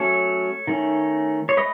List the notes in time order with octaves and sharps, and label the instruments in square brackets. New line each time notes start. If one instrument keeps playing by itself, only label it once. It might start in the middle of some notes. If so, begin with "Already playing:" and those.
Already playing: [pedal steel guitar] F#3 A3 C#4 A4 C#5
D#3 A3 C#4
C#5
A3 B4 D#5